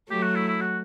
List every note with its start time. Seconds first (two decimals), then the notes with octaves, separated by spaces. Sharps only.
0.10 F#3 A3 G4
0.23 F#4
0.35 E4
0.48 E4
0.60 F#4